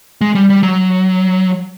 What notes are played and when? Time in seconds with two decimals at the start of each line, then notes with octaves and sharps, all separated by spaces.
0.21 G#3
0.35 G3
0.50 G3
0.63 F#3